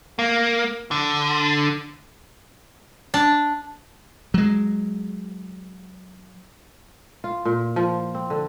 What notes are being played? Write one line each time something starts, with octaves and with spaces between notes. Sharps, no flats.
A#3
D3
D4
F#3 G#3
F4
A#2
F3
C4
D3